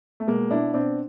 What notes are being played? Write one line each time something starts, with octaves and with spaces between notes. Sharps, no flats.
A3
B2 G#3 A#3
B2 D4 E4
B2 C4 D4